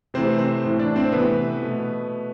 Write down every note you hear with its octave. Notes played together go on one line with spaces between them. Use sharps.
C3 E3 A3 C4 C5
C4 C5
A2 E3 A3
D4 D5
C4 C5
C3 E3 A3 B3 B4
B2 A3